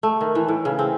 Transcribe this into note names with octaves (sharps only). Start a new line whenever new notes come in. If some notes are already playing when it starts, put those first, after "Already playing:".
A3
D#3
E3
A2
C#3
C4